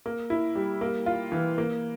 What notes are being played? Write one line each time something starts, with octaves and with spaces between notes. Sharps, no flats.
A#3
E4
G3
A#3
F4
E3
A#3